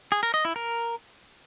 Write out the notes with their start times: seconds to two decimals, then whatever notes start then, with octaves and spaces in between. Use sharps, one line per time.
0.12 G#4
0.23 A#4
0.34 D#5
0.45 E4
0.56 A#4